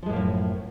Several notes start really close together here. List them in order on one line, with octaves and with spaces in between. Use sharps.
F3 G#3 A2 A#3 F#2